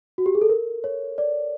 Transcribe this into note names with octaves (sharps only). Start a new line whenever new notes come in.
F#4
G4
G#4
A4
A#4
C#5
D5